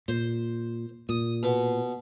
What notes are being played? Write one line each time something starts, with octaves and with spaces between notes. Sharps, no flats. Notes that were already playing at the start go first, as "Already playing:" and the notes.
A#2 C5
A#2 D#6
B2